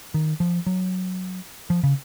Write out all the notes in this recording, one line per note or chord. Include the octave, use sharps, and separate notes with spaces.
D#3
F3
F#3
F3
C#3